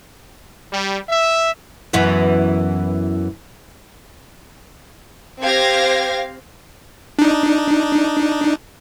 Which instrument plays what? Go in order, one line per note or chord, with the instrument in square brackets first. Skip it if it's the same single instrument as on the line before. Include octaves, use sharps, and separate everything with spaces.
[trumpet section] G3
E5
[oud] F#2 E3 B3
[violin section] C4 G4 C5 F5 G#6 A#6
[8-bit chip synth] D4 D#4